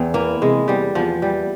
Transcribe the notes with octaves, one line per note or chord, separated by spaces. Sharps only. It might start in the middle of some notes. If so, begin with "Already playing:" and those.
Already playing: E2 C4
E3 A#3
C3 G#3
E2 G3
E2 F3
E3 G3